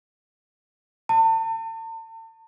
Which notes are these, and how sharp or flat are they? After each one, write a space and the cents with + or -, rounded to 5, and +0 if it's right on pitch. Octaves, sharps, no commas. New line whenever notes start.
A5 +40